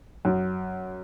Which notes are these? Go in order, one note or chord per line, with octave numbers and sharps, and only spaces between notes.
F#2